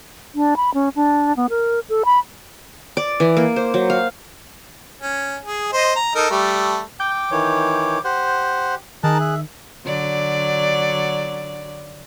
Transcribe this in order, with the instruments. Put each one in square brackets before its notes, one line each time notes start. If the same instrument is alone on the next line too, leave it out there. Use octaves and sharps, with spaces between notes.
[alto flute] D4
B5
C#4
D4
B3
A#4
A4
B5
[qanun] D5
E3
A#3
C5
F#3
F5
[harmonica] C#4
G#4
C5 D#5
A#5
D#4 A4 A#4
G3 A3
[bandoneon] G5 [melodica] D6 [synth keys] G6
[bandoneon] D#3 E3 C#5
[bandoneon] G4 [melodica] C5 F#5
[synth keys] D#3 [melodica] D#4 A#4 A5 [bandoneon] G#4 F#6
[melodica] E5
[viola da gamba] D3 F#3 D5